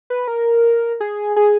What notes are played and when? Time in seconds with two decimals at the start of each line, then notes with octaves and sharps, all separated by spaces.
0.10 B4
0.28 A#4
1.00 G#4
1.36 G#4